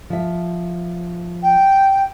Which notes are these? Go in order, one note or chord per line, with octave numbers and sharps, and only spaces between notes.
F3 E5
G5